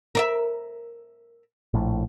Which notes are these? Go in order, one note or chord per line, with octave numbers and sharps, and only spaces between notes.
A#4 D5 E5
A#1 A2